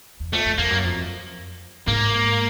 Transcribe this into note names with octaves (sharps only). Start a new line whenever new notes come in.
E2
F2 A3
F2
F2 A#3
F#2
F2
G#2 A#3